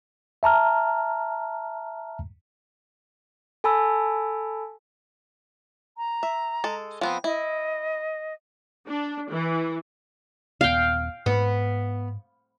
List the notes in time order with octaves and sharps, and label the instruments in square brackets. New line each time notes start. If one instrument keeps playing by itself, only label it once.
[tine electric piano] E5 A5 A#5 F6
[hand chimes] A4 G#5 A5 B5 E6
[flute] A#5
[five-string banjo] E5
G#3 A4
F3 B3 C4
[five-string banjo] E4 [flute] D#5
[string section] D4
E3
[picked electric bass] D#1 B3 [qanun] F5 G5
[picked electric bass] G#2 [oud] B3